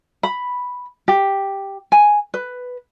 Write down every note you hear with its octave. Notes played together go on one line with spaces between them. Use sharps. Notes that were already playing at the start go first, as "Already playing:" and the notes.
B5
G4
G#5
B4